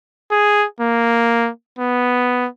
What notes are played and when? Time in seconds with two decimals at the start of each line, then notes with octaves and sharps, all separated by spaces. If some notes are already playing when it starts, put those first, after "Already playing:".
0.31 G#4
0.80 A#3
1.79 B3